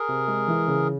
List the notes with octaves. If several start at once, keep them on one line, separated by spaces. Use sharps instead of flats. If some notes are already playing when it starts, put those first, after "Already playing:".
Already playing: G#4 A#4
C3
G#3
E3
C#3